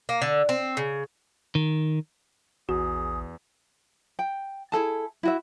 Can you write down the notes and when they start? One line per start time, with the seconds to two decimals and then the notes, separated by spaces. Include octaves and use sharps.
0.09 A#3
0.22 D3
0.49 C4
0.77 C#3
1.55 D#3
2.69 A#1 E2 F#4 G#4
4.19 G5
4.72 E4 G#4 A4 A5
5.23 E4 F#4 E5